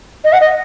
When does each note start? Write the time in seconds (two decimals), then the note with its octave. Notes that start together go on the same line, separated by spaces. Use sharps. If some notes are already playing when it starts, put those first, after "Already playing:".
0.24 D#5
0.33 F#5
0.41 D#5